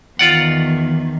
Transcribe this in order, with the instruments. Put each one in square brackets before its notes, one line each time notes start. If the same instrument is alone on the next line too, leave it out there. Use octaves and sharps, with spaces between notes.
[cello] E2 D#3 [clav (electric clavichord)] F4 D5 F#5